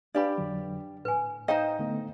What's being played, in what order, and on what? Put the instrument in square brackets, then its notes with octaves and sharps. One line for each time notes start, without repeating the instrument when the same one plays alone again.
[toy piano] D4 B4 B5 [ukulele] G4 D5 [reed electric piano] F5
[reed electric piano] F2 D3 F#3
[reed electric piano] A2 [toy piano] B4 G#5
[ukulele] D#4 C5 D#5 [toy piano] F5 G5 A#5
[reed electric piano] D3 A3 B3